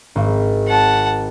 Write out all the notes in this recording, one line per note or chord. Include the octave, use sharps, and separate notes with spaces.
G#1
F#5 A5